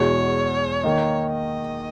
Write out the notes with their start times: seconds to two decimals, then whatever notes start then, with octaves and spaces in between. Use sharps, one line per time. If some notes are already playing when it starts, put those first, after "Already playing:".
Already playing: E2 B2 G#3 C#5
0.83 D#3 A#3 D#4
1.31 D#5